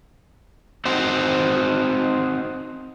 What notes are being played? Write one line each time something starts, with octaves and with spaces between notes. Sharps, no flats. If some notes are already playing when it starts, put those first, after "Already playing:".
C4 D#4 F#4 C5